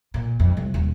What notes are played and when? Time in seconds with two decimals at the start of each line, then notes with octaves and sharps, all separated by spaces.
0.14 A#2
0.40 F2
0.57 C2
0.74 D#1